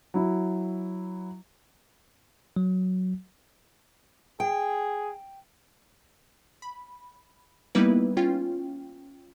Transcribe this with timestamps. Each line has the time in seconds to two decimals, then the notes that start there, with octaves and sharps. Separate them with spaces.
0.14 F#3 E4
2.56 F#3
4.40 G#4 G5
6.62 B5
7.75 G3 A#3 B3 D#4 E4 B4
8.17 C#4 F4 G5